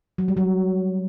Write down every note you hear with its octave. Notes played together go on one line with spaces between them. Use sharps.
F#3
G3
F#3